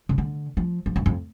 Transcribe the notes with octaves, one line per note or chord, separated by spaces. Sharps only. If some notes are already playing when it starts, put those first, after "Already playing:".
C#3
D3
F3
F3
F#2
F2